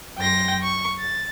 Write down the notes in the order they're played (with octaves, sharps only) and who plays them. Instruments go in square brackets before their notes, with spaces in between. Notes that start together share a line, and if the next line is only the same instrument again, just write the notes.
[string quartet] F#2 G5 C6 A#6
C#6
A6